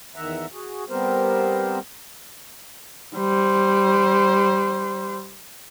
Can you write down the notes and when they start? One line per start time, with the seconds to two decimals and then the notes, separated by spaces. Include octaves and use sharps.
0.16 E2 D#3 E5 F#5 A#5
0.52 F#4 G#4
0.89 G3 B3 C4 G4 A#4 C5
3.16 G3 C5